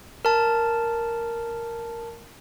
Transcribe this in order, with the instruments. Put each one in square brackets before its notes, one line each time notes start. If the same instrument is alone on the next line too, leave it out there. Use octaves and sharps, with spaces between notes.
[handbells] A#4 A5